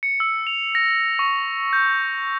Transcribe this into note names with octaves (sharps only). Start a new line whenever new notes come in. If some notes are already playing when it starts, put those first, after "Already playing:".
C#7
E6
F7
A#6
C#6
G6